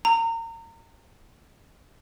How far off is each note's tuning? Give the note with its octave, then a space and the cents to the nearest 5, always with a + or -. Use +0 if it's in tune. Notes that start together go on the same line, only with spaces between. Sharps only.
A#5 -30